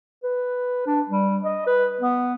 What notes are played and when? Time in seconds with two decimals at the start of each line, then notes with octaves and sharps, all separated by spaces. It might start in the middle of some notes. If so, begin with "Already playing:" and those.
0.24 B4
0.86 D4
1.09 G3
1.45 D#5
1.66 B4
2.01 B3